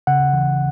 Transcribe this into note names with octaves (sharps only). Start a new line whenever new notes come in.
C#3 F#5
E3